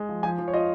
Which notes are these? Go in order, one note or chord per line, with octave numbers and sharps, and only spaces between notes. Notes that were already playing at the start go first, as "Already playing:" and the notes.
Already playing: G#3
F3
F3 G#5
F3
C#5
F4 D#5